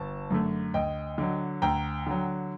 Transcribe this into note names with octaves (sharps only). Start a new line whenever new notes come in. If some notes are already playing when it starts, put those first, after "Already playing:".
Already playing: G1 A5
F#2 D3 A3
D2 D#5 G5
D3 F#3
D2 G5 A#5
D3 F#3